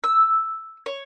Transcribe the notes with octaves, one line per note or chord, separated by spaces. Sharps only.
E6
C#5